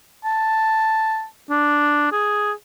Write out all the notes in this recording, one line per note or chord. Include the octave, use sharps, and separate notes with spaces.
A5
D4
G#4